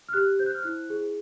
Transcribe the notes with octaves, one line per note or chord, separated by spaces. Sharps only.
F6
G4 F#6
C5 G6
F#6
F6
E4 F#6
G#4